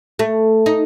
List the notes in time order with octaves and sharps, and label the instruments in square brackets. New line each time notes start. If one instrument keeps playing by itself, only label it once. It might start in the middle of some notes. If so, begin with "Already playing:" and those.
[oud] A3
D#4